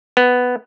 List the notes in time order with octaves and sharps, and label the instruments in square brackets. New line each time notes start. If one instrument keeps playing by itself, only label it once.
[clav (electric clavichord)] B3